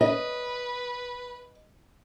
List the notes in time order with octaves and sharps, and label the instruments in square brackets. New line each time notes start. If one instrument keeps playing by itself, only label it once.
[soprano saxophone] B4 [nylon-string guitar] D#5